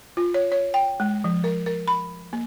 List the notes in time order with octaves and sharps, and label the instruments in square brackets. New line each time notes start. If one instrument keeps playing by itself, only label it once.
[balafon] F4
C#5
C#5
G5
G#3
F3
A#4
A#4
B5
A#3